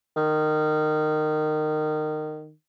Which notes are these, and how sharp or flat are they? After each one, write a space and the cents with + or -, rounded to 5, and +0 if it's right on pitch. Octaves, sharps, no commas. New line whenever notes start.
D#3 -20